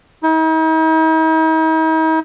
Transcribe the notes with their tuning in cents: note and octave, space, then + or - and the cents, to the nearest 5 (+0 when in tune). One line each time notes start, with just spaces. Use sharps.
D#4 +45